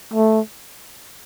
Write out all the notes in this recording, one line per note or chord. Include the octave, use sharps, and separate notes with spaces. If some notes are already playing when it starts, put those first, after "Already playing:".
A3